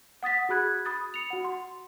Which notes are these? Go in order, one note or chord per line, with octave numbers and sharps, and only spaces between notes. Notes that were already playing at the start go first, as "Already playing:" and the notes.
F#5 D#6 A6 B6
F#4 G#4 B5 F#6 G#6
B5 D#6 A6
C#7 F7
F#4 F#5
C6